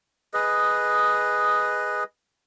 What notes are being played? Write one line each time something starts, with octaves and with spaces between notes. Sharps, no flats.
G#4 B4 D#5